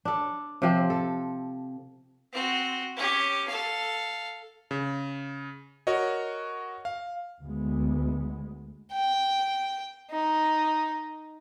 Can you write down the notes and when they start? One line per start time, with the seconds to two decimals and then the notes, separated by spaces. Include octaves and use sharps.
0.05 D4 A4
0.62 C3 F3 C4
0.90 A4
2.33 C4 F#4
2.96 C#4 G4
3.48 A4 F5
4.71 C#3
5.87 F#4 A#4 C#5 D#5
6.85 F5
7.41 D2 G#3 B3
8.92 G5
10.11 D#4